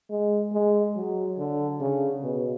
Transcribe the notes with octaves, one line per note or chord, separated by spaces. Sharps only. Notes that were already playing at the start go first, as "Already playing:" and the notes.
G#3
G#3
F#3
D3
C#3
B2